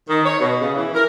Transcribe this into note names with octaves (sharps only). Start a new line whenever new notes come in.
D#3
C#5
B2
C#3
E3
A#4